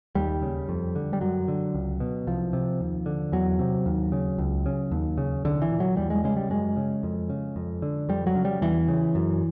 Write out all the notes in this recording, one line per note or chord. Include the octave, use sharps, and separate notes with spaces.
D#2 G3
C#3
F2
D3
G3
F#2 F#3
D3
C#2
B2
C2 F3
C3
D#2
D3
E2 F#3
C3
D#2
C#3
C#2
C#3
D#2
C#3
C2 D3
E3
A#2
F#3
E2 G3
G#3
C#3 G#3
G3
F#2 G#3
C#3
F2
C#3
F2
D3
F2 G3
F#3
C#3
G3
E2 E3
C#3
F#2